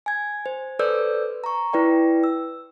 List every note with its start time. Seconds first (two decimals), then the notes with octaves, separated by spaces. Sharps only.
0.06 G#5 G#6
0.46 C5
0.79 A4 B4 C5 D5 E6 G6
1.44 A#5 C#6
1.73 E4 B4 D5 G5
2.24 E6